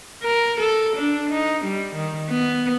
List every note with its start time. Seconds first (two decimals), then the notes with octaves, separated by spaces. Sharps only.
0.23 A#4
0.61 A4
0.96 D4
1.30 D#4
1.65 G3
1.95 D#3
2.30 B3